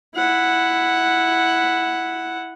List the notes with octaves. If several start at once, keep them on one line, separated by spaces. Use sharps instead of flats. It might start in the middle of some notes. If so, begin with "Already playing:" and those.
E4 F#5